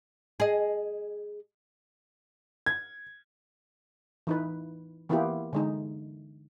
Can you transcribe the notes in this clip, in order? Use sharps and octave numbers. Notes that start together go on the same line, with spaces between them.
G#4 D#5
G#6
E3 D#4 B4
E3 A#3 B3 E4 F4 G4
D3 G#3 D#4